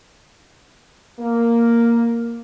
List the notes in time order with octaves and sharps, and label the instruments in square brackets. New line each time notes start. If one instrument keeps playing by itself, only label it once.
[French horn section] A#3